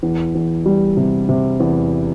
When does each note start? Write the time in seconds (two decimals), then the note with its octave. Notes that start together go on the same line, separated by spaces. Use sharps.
0.03 E2
0.35 E2
0.66 G3
0.97 C3
1.29 C3
1.60 E2